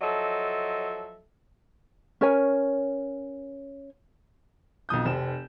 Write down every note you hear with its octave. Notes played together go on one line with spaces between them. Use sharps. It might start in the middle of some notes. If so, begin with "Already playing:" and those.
F3 F#3 A4 D#5 E5
C#4 A#4 C#5 G#5
B1 F2 D#6 G6
F1 C4 E7